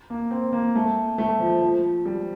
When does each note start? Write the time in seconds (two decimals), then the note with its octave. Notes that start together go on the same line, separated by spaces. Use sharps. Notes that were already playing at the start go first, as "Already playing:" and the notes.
0.10 A#3
0.31 C4
0.52 A#3
0.75 A3
1.18 A3
1.40 F3
1.61 F3
2.05 G3